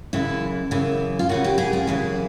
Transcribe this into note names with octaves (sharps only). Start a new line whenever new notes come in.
F#2 C#3 E3 E4
F#2 C#3 E3
F4
F#2 C#3 E3 F#4
G4
G#4
F4
F#2 C#3 E3 E4